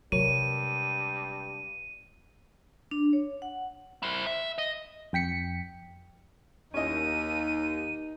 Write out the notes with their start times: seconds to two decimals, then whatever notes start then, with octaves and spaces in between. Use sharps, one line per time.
0.12 G2 C3 F#3 G#3 A#4 C#5 D#7
2.91 D4
3.13 C#5
3.42 F#5
4.03 E4 C5
4.27 E5
4.58 D#5
5.13 F2 G5 B6 C#7
6.74 D#2 C#4 D#4 D#5 D#7